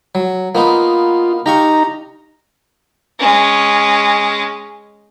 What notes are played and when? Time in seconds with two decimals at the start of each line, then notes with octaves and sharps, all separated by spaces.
0.15 F#3
0.55 A#3 B3 D#4 F4
1.46 D#4 G4 F5 A#5 C#6
3.19 G#3 C#4